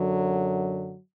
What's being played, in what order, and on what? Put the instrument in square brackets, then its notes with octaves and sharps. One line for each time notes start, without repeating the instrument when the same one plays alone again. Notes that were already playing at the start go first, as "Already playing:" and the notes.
Already playing: [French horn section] F#2 D3 F#3